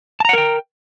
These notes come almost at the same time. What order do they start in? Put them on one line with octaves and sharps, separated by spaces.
A5 A#5 F#5 A#4 G5